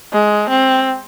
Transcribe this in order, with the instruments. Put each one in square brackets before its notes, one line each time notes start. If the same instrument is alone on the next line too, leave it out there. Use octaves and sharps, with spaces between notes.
[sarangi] G#3
C4